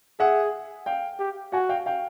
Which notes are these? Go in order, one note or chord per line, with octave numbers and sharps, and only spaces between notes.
G#4 E5 F#5
F5 G5
G4
F#4 F#5 G#5
F5 G5
F5 G5